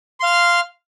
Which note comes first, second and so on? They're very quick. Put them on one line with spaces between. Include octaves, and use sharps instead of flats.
C6 F5 F6